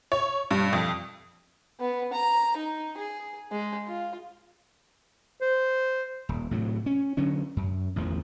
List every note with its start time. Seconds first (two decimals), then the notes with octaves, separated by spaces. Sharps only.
0.12 C#5
0.51 G2
0.73 F2
1.80 B3
2.13 A#5
2.57 D#4
2.97 G#4
3.52 G#3
3.87 F4
5.41 C5
6.29 D#1
6.51 A2 C3 F#3
6.86 C#4
7.17 D3 F#3 C#4
7.57 F#2
7.96 A1 E2 D#3 F3